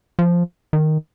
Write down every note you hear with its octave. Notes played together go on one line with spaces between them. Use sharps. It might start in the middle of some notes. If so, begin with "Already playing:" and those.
F3
D#3